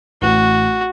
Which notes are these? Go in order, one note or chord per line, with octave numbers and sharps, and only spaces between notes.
A1 F#4